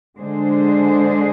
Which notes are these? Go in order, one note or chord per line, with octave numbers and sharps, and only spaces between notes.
D3 G#3 D4 G#4 C5